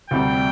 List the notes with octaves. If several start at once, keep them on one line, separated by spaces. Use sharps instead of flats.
D2 C3 G3 G5